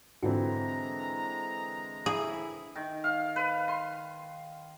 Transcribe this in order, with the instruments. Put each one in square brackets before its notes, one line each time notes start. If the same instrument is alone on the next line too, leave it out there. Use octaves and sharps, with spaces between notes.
[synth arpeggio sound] G#2 F4 F#4 [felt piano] D3 E3 C4 [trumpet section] G#3 A#5
[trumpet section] E4 [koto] G#4
[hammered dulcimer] D#3
F5
B4
C6